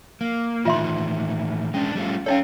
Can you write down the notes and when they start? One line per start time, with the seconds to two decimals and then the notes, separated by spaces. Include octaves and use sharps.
0.21 A#3
0.65 A2 D#3 E3 F4 E5 C6
1.74 G#3 C#4 D4
1.95 G3 A3 F4
2.26 C#4 D#4 A4 C#5 D#5 F5